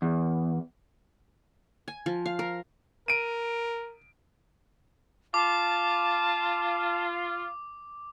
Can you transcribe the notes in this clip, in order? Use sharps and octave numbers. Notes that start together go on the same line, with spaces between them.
E2
G#5
F3
F5
A#4
A#4 D7 D#7
F4 A5 D6